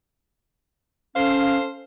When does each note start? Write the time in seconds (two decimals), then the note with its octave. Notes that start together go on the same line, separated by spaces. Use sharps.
1.15 C#4 A4 C5 F5